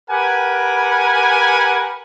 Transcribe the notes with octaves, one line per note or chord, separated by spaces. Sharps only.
G4 A#4 B4 F#5 G#5